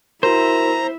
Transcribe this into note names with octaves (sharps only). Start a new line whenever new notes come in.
E4 F#4 A#4 C5 E5 A#5